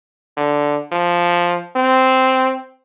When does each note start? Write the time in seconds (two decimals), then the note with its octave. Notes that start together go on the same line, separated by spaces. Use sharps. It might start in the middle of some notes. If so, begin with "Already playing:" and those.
0.37 D3
0.92 F3
1.76 C4